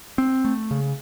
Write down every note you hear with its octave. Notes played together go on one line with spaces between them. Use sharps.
C4
A3
C#3